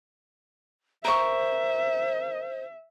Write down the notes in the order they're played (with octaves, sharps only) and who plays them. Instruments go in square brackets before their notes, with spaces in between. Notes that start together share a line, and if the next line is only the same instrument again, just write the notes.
[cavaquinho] A#4 C#6 [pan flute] C5 [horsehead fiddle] E5